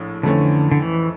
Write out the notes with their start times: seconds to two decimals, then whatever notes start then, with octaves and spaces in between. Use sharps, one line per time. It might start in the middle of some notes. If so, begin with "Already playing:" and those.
Already playing: A#1 A2
0.23 F2 D3 E3 A3 C#4
0.71 D3
0.82 E3